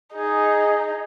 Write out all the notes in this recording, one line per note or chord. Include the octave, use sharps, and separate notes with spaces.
D#4 G#4